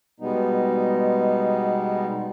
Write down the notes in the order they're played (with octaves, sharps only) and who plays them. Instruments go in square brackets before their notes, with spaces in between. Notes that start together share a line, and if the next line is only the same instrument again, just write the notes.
[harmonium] B2 G3 G#3 B3 D#4